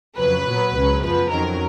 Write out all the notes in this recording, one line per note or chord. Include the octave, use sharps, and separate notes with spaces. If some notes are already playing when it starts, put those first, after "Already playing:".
F2 C#3 F#3 B4
A#2 F#3 B3
C#2 C#3 F#3 C#4
F#2 F3 B3 B4
F2 D#3 F#3 C#4 A#4